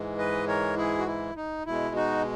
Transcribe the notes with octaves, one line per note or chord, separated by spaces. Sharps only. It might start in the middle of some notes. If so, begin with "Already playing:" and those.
Already playing: G#2 E3 G#3
B4 D#5
A#4 C#5
E4 G#4
F#4
E4
D#4
B2 G#3 E4
D#4 F#4